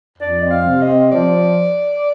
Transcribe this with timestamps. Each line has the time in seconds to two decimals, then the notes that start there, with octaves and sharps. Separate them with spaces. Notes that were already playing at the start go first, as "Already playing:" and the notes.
0.18 F2 D5
0.40 C4 D#5
0.49 F5
0.65 C3
0.81 D#5
0.88 C4
1.11 F3 D5